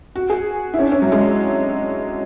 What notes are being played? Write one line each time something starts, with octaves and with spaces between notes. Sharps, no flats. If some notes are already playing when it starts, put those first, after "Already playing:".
F#4
G#4
E4
C#4
D4
C#4
F#3
G#3